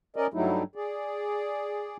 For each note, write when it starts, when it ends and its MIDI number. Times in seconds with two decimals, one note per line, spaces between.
0.16 0.27 61
0.16 0.27 70
0.16 0.27 74
0.16 0.27 75
0.34 0.63 43
0.34 0.63 54
0.34 0.63 55
0.34 0.63 57
0.34 0.63 63
0.34 0.63 64
0.75 1.97 68
0.75 1.97 74